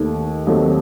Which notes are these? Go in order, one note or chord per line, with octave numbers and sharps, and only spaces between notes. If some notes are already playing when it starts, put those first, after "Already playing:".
Already playing: D#2 D#3 A3
D#2 D#3 F#3 A3 C4